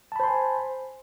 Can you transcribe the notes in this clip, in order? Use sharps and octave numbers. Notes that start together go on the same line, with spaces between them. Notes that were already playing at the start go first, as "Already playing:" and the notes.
C5 G#5 A5 B5 C6